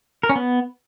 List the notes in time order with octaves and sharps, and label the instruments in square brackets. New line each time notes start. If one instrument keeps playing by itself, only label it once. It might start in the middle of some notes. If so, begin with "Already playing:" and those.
[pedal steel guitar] A#4
C#4
B3